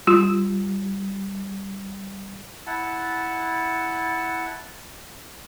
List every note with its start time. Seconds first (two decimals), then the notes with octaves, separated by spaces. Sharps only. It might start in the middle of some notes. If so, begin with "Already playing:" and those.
0.07 G3 F4 C6 E6
2.67 E4 F#5 A5